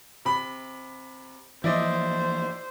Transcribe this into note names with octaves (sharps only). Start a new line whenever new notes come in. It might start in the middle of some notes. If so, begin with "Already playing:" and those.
C3 B5
E3 F3 A#3 E4 C5 D5 D#5